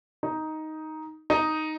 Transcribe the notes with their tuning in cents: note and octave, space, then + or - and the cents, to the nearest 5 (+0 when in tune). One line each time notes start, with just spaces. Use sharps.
D#4 +5
D#4 +0